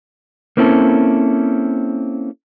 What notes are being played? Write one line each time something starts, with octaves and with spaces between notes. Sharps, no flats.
A#3 C4 C#4 E4 F4 A4